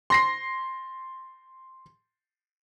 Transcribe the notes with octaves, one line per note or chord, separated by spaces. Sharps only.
C6 A#6 C7